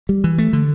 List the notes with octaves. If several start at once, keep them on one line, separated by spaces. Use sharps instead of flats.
G3
E3
A3
D3